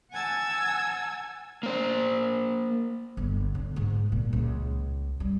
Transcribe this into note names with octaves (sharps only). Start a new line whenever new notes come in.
F#5 G#5 A5 E6 G#6
A#3 C5
G1
D3
G#2
A#2
C#2
G3